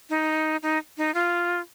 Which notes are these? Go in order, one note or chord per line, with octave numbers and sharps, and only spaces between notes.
D#4
D#4
D#4
F4